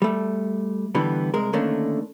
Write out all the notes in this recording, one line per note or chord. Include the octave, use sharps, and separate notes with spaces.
G3 A3
D3 E3 G3 B3
C2 G#3 A#4
D3 D#3 A3 A#3 C#4 D4